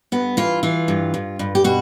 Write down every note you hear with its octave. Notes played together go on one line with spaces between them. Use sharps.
G2 B3
E3 F4
E3 F4
G2
G2
G2
G4
B2 F#4